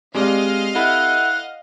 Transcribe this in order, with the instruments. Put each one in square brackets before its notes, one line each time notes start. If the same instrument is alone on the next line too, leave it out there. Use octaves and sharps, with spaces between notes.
[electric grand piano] G#3 [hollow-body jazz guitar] C4 G4 D5 [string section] D#5 F5 F6
[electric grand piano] E4 A4 B5 [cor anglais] F#5